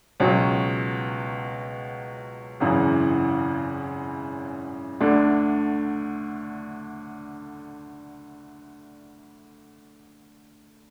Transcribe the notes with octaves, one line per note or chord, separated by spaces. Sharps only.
C#2 B2 F#3 C#4 F#4
G#1 F#2 C#3 E3
D2 D3 A3 D4